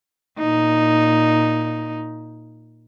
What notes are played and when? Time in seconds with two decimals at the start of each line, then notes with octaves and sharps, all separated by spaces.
0.39 A#2 D#4